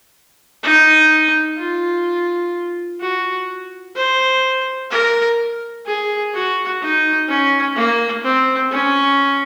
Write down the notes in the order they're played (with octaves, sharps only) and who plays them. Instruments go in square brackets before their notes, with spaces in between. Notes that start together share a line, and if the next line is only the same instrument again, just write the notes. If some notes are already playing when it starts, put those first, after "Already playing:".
[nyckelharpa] D#4
F4
F#4
C5
A#4
G#4
F#4
D#4
C#4
A#3
C4
C#4